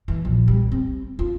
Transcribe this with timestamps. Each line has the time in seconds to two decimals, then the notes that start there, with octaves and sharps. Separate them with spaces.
0.08 E3
0.25 A#1
0.48 G3
0.72 C4
1.19 F4